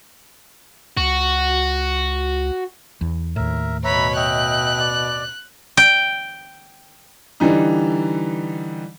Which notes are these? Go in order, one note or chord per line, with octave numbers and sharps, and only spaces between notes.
C#2 F#4
E2
D#2 A2 A#4 E5
B2 B4 C#5 E5 A#5 B5
D#5 E5 G5 F#6
D5
G5
D3 E3 G3 D#4